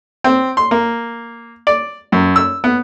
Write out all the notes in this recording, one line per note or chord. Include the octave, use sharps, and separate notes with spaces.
C4
C6
A#3
D5
F#2
E6
B3